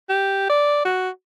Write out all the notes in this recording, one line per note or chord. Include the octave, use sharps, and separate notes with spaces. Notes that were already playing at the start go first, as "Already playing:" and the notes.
G4
D5
F#4